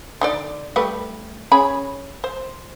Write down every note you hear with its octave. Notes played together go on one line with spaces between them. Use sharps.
D3 D#4 D5
G3 A3 B4
C#4 G#4 B5
C5